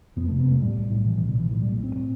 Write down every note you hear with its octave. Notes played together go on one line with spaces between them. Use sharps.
F2 B3
C3 A3
B3
G1 A3
A2 G3
B1
A2
B2 E3
B1 E3
D3
B2 E3
A2 F3
B1 G3
A3
A2 C4
A2